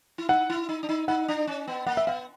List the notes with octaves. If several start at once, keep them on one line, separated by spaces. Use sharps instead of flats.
E4
D#4 F#5
E4
D#4
D4
D#4
D#4 F#5
D4
C#4
B3
A#3 F#5
E5
B3 F5